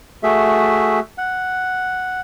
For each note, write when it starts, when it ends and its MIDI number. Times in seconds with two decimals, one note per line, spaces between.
0.23 1.00 57
0.23 1.00 66
0.23 1.00 68
0.23 1.00 76
1.18 2.21 78